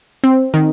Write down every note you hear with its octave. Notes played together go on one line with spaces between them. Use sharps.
C4
D#3